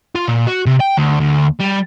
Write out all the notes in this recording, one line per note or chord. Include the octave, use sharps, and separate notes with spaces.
F4
A#2
F#4
C3
G5
D2
D2
G3